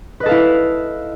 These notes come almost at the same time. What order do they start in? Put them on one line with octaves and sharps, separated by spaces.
B4 D#5 A4 F5 E4